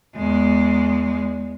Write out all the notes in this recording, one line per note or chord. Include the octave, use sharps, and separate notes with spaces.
E2 G#3